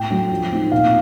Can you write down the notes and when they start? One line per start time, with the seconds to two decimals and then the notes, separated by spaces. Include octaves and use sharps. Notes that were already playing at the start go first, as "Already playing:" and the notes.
Already playing: A2 G5
0.10 F#3 A3 D4
0.30 F3
0.51 A3 C4 D#4
0.72 A#2 F5